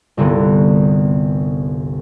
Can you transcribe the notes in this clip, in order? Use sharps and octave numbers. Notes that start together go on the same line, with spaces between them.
G1 C2 D3 B3